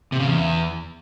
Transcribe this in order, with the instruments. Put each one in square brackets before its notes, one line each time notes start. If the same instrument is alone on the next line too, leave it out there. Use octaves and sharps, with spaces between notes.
[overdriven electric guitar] C3
C#3
E2